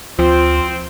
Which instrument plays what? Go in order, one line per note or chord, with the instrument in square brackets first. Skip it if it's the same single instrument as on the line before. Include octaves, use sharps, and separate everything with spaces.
[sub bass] D2 [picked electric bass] F3 [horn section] C4 [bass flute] F4